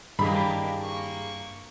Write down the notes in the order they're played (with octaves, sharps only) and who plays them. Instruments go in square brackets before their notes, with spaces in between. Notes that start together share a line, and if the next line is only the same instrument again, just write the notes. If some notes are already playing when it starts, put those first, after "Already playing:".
[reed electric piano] G2 [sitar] D#3 G4 G#4 [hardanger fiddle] A#3 D4 [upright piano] B5
[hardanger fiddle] A#3 C#6